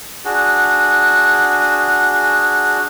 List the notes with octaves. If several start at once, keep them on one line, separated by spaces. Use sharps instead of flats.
D4 F#4 G#4